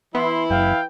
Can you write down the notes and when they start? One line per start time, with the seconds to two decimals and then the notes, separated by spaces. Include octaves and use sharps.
0.15 E3 B3 E4 C6
0.50 F#1 F5 G5